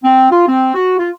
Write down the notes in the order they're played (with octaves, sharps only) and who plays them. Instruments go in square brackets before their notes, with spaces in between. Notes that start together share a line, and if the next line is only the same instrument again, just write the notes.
[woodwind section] C4
F4
C4
F#4
F4